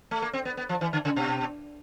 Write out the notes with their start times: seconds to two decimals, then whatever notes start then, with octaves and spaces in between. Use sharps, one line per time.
0.11 A3
0.22 A#3
0.33 C4
0.45 B3
0.57 B3
0.69 F3
0.81 E3
0.93 D3
1.05 C#3
1.16 B2